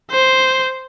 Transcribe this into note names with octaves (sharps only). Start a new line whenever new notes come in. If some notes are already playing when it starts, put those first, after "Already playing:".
C5